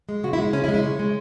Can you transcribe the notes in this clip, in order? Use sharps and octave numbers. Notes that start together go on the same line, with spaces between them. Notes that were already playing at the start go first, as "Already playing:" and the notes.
G#3
C#3 F#4
E4
G#3
C#3 C#4
E4
G#3
E4
C#3 C#5
G#3